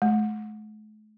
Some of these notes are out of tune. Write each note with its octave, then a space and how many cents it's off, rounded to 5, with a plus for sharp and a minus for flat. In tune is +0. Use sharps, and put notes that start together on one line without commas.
A3 -45